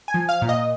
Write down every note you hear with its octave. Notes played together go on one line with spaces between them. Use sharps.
G#5
F3
F5
A#2
D#5